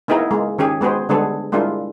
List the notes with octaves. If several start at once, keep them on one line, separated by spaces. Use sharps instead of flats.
A#3 B3 D#4 E4 G#4 A#4
G#3 A#3
D#3 C#4 G4 G#4
G#3 B3 F#4 G#4 C5
D3 G3 G#3 B3 G#4 A4
G3 G#3 A#3 D4 E4 F4